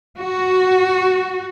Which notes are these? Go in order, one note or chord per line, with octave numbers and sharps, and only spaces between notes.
F#4